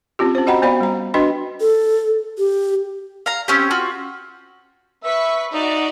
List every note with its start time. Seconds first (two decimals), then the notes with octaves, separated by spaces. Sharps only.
0.19 C4 C#4 F4 G4
0.35 C#4 C5
0.47 F#4 D#5 F#5 G5 A#5 B5
0.62 B3 C5 D5 F5 B5
0.80 G3 A#5
1.14 D4 F#4 B4 D#5 G5 C6
1.61 A4
2.38 G4
3.26 F5 A#5
3.48 C4 C#4 G4
3.71 F4 F#4
5.04 B4 E5 C#6 B6
5.54 D#4 F#4 D5 E5